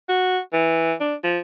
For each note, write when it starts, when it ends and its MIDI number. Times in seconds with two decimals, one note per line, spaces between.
0.09 0.39 66
0.53 0.93 52
1.00 1.14 62
1.24 1.39 53